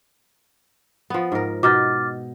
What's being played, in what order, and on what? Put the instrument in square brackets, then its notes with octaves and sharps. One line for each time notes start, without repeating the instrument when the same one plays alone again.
[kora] F3 B3
G#2 A#4
[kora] B2 D#4 [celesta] D6 F6 A6